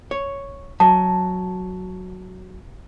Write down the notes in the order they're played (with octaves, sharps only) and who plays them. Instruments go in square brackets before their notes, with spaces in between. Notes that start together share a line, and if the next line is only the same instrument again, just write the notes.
[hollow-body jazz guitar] C#5
[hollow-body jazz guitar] F#3 [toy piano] A5